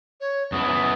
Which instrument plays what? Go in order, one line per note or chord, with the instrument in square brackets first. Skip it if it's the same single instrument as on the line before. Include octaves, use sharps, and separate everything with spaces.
[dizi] C#5
[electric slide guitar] F#2 B3 E4 [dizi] D#6